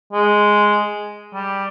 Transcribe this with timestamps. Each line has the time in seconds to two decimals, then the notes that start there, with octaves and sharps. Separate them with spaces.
0.13 G#3
1.34 G3